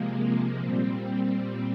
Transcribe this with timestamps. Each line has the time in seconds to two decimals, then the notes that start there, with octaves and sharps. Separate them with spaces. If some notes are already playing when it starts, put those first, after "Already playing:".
Already playing: C3 F3 G#3 A#3
0.61 A#2 G3 C4